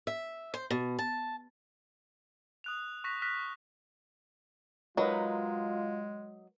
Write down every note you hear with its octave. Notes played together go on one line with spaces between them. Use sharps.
E5
C5
B2
A5
D#6 F#6 F7
C#6 F#6 A#6 B6
F6 F#6 A#6 B6
F#3 G#3 D#4 F4 A#4 B4 D#5